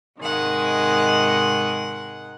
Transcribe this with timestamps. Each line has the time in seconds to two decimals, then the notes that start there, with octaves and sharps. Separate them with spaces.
0.20 G#2 C3 D#3 G#3 F#5